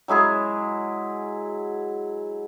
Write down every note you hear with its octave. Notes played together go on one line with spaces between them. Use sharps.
F#3 G#3 E4 G#4